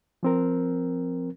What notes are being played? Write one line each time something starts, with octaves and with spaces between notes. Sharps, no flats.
F3 C4 A#4